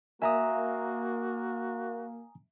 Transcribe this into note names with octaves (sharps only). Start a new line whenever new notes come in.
A#3 F#4 E5 G#5 A#5 D#6